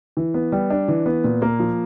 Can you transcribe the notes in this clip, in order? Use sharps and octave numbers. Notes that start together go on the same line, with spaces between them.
E3
B3
G3
D4
E3
B3
A#2
A#3
F3